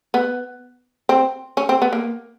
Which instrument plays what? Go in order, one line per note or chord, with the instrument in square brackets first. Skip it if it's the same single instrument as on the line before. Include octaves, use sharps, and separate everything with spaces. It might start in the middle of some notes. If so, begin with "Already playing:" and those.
[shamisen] B3
C4
C#4
C4
B3
A#3